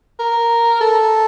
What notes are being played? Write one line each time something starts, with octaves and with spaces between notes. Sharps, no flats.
A#4
A4